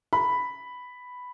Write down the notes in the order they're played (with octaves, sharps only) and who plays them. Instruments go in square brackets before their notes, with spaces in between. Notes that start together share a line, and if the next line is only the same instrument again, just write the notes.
[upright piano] B5